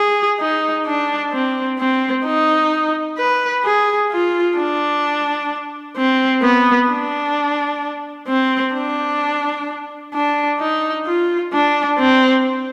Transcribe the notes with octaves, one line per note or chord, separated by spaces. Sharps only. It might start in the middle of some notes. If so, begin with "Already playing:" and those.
Already playing: G#4
D#4
D4
C4
C4
D#4
B4
G#4
F4
D4
C4
B3
D4
C4
D4
D4
D#4
F4
D4
C4